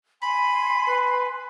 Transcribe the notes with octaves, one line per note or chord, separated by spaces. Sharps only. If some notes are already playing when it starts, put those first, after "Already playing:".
G#5 B5 C6
B4